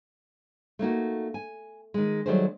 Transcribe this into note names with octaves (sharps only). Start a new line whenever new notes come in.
A3 A#3 D#4 F#4
G#5
D#3 G#3
D#3 F#3 G3 A3 G#4 C5